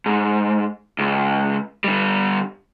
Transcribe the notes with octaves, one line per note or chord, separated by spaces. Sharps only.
G#2
C#2
D3 G3